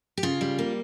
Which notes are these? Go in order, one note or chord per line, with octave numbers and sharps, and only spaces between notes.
G4
C#3 F4
G3
A#3